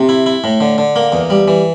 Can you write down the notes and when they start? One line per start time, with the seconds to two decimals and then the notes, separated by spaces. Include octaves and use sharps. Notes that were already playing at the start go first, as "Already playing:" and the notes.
Already playing: C3
0.09 E4
0.26 E4
0.44 A2
0.61 D3
0.78 D3
0.96 A#3
1.12 E2
1.30 G3
1.48 E3